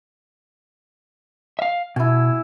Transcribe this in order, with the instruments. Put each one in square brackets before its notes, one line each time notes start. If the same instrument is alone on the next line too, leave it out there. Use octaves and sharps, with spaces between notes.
[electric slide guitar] E5 F5
[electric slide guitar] B2 [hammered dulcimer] E4 G#5